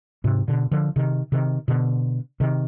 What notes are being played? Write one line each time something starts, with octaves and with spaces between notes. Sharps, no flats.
G#2 C3
B2 D3
D3 F3
C3 D#3
C3 D#3
B2 D3
C3 D#3